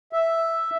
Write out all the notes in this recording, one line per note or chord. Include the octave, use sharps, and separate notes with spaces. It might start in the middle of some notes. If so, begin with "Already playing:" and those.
E5